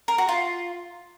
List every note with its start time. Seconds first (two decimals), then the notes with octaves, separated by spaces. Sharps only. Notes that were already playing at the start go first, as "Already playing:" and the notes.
0.08 A#4
0.18 F#4
0.29 F4